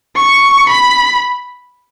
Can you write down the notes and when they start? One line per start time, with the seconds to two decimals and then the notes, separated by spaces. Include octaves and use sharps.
0.16 C#6
0.69 B5